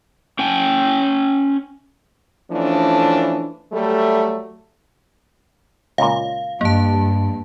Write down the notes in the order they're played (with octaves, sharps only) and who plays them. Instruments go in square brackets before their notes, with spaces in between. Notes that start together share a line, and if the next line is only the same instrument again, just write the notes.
[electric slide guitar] C#4 G5 G#5
[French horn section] E3 F3 A3 C#4 D4
F#3 G3 A3
[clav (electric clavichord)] C#2 A#2 [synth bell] F5
[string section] G2 [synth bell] A#3 A5